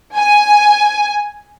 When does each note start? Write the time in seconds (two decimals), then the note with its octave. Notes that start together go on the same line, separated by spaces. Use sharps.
0.16 G#5